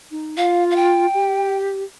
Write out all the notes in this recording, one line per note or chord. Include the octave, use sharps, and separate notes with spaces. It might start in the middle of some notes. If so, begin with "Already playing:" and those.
D#4
F4 F5
F5
G5
G4